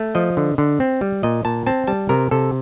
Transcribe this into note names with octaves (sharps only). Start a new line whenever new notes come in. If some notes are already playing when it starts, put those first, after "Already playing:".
Already playing: A3
F3 D#5
D3
D3
C4
G3
A#2 D#5
A#2 A5
C4 A5
G3 A5
C3 A#4
C3 A4